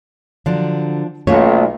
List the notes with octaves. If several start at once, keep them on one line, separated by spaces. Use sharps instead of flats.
D3 F3 F#3 D4
B1 A3 A#3 C#4 F4 F#4 C#5